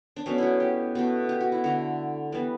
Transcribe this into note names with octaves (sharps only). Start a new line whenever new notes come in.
D4
B2 F#3 A3 C#4
E4 F#4
G4
B2 A3
G4
F#4
E4
D3 A3 F#4
E3 G3 B3